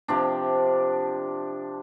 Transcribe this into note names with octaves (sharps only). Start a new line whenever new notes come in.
C3 F3 D4